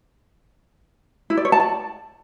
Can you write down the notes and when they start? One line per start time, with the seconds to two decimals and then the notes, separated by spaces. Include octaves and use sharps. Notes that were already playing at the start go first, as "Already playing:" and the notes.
1.30 E4
1.37 D5
1.45 C#5
1.52 A5
1.60 D5